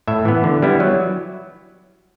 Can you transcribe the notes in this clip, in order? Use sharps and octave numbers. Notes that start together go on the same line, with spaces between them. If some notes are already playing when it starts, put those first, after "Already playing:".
A2 E5
E3 B3
D3
G3 B3 E4
F#3